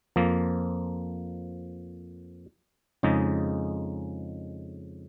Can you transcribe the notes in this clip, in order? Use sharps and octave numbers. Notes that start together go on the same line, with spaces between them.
F2 F3 A#3
F2 C#3 G#3 D#4